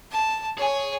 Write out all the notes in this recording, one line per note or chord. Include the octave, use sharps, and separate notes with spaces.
A5
G#4 C#5 G#5